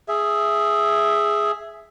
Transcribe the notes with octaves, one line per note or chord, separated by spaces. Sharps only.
G#4 E5